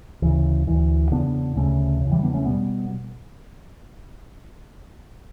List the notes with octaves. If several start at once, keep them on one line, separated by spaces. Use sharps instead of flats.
D2 C#3 E3
D2 D3 E3
E2 C#3 B3 D4
D2 C#3 A3 C#4
E2 C#3
E3 G3
B3 D4
A3 C#4
B2 G3 B3